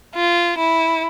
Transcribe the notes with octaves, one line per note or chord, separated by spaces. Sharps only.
F4
E4